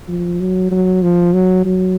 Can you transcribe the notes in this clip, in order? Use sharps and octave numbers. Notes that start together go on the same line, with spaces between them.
F3
F#3
F#3
F3
F#3
F#3